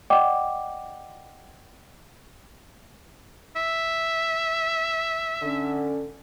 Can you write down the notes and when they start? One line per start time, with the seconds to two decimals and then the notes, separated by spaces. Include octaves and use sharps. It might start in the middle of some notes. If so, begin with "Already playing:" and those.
0.10 D5 D#5 F#5 G5 D6
3.56 E5
5.42 D3 C#4